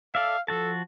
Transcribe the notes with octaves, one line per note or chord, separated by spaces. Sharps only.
A4 D5 E5 F5
F3 F#4 A4 A5